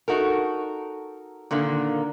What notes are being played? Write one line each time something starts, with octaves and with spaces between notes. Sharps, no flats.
D#4 F#4 A4 A#4
A#2 D3 D#3 A#3